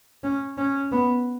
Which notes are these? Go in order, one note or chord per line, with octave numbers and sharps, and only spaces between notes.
C#4
C#4
B3